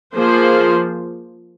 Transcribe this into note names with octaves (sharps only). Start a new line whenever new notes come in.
F3 A#3 G#4 C5